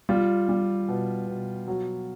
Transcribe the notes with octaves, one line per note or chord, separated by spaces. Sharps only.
G3 F4
G3
B2
B2
F#3